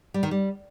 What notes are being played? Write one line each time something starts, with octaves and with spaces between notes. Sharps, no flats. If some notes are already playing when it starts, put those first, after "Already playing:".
G3
D#3
G3